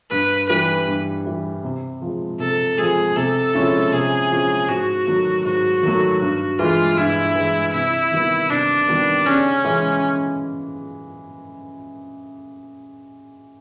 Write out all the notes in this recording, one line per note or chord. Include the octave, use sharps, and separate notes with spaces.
G2 B4
E3 G3 B4
G2
E3 G3
C3
F3 G#3
C3 A4
F3 G#3 G#4
C3 A4
F3 G#3 C#4 E4
C3 G#4
F3 G#3 C#4 E4
G#2 F#4
D#3 F#3 A3
G#2 F#4
D#3 F#3 A3
G2 F#4
E3 G#3 F4
G2 E4
E3 G#3
C3 E4
D#3 G3 B3
C3 D4
D#3 G3 B3
C#3 C#4
E3 G#3